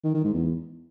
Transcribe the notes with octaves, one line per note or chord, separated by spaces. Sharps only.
D#3
D#3
G#2
E2